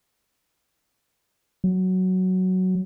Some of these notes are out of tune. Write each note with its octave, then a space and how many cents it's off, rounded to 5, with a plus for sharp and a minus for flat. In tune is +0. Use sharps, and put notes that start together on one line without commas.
F#3 +5